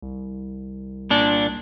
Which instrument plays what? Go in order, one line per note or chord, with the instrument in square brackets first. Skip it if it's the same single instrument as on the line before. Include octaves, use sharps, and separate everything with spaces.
[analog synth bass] C2
[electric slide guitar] A#2 D4